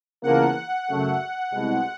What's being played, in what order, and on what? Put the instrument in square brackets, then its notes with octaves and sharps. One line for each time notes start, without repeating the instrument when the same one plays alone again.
[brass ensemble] E2 C#3 F3 A#3 [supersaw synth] F#5
[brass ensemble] F#2 C#3 F#3 A3
C2 B2 G#3